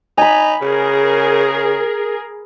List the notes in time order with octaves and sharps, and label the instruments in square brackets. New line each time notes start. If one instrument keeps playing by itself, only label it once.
[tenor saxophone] D#4 [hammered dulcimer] G#5 B5
[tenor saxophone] C#3 [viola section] G#4 A#4